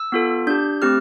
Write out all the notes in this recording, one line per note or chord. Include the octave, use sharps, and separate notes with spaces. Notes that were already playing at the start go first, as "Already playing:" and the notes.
Already playing: E6
B3 F4 A4
D4 G4 G6
A3 C4 G4 F6